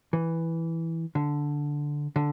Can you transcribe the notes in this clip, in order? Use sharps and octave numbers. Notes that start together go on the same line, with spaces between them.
E3
D3
D3